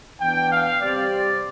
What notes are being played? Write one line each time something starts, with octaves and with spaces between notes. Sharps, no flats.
E3 B3 D4 G5
F5
C3 G3 C4 D5